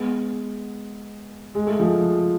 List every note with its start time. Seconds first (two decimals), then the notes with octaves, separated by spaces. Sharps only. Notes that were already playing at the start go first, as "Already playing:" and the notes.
Already playing: G#3 B3
1.55 G#3
1.67 A3
1.79 F3 G#3